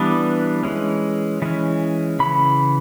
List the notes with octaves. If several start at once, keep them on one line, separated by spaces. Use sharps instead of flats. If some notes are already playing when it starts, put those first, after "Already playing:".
Already playing: E3 G3 B3 D4
E3 G#3 C#4
E3 G#3 C#4
C#3 E3 B5